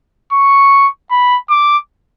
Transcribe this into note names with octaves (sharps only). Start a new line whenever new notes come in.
C#6
B5
D6